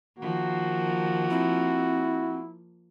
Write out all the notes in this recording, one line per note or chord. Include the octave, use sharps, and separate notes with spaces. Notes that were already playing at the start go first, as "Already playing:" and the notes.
D#3 F3 A#3 F#4
C4 E4